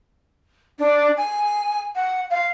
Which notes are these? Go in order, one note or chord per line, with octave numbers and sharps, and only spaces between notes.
D4
G#5
F#5
F5